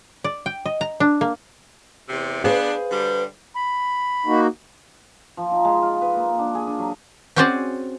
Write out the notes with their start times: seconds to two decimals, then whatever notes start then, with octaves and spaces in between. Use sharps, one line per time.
0.24 D5
0.46 G5
0.65 D#5
0.81 A#5
1.00 D4
1.21 A#3
2.09 E2 C3
2.44 B3 D4 G#4 B4 C5 F5
2.91 D3 G3
3.56 B5
4.26 A#3 D#4 F#4
5.37 F3
5.52 D#4
5.65 G#3
5.82 F4
6.02 B4
6.16 A#3
6.39 D4
6.55 G#4
6.67 D4
6.79 F#3
7.36 C4 C#4 F#4 G#4 C5 D5